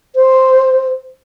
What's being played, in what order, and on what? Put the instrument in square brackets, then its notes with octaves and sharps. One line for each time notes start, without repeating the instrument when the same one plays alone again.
[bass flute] C5